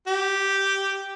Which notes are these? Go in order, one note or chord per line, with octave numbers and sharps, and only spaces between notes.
G4